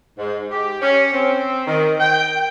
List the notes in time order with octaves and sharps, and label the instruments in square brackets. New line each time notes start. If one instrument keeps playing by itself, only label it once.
[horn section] G#2
G4
C#4
C4
D#3
G5